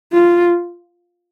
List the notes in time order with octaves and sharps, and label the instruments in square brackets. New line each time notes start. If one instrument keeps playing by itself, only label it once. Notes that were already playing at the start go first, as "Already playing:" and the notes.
[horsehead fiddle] F4